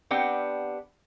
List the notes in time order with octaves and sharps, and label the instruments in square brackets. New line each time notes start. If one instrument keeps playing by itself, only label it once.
[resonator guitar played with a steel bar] B3 C4 D4 G4 F#5 G5